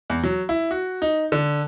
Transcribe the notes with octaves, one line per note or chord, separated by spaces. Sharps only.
E2
F#3
E4
F#4
D#4
D3